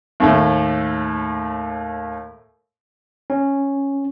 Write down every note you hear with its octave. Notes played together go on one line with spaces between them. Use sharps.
D#2 A2 A3
C#4